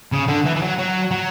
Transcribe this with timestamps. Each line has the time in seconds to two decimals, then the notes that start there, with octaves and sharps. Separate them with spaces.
0.12 C#3
0.28 D3
0.46 E3
0.56 E3
0.62 F#3
0.78 F#3
1.11 F#3